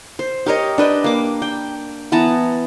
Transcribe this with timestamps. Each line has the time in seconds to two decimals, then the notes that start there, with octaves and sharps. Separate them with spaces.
0.19 C5
0.46 G4 A#4 C#5 D#5
0.78 D4 B4 D#5 G5
1.04 A#3 D6
1.42 G5
2.12 E3 B3 A5 A#5